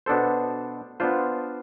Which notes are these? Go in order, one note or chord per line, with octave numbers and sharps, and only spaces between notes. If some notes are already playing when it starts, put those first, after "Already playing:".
B2 B3 D4 A4 C5
B3 D4 F4 C5